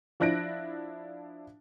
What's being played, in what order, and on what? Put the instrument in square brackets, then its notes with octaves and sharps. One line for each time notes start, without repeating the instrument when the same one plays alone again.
[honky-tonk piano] F3 D4 E4 F#6 A#6 D7